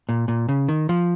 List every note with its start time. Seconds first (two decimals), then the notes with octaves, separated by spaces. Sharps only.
0.09 A#2
0.28 A#2
0.49 C#3
0.69 D#3
0.89 F3